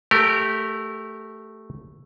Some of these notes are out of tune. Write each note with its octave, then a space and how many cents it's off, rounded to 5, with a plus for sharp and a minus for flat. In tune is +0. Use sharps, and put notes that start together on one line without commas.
A3 +0 G4 +0 A#4 -25